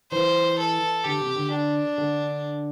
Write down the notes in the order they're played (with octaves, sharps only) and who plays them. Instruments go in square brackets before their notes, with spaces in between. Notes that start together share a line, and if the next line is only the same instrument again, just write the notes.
[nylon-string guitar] E3 [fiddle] C5
[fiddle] A4
[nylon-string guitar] D3 [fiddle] G4
[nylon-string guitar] C3
D3
[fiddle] D4
[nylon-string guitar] D3